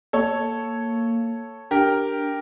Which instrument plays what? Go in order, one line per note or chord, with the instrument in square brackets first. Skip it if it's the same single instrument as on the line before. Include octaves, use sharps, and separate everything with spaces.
[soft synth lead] A#3 [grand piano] A4 C#5
[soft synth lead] D4 [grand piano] G4 A#4